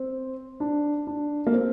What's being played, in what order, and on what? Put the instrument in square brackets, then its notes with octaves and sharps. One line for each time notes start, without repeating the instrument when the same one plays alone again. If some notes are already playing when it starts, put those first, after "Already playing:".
Already playing: [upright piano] C4
D4
D4
A#3
C4